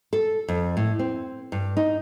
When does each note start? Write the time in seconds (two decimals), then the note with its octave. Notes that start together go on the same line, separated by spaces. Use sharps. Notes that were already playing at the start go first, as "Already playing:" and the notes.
0.13 A4
0.48 F2
0.77 A2
0.99 C4
1.52 G2
1.77 D#4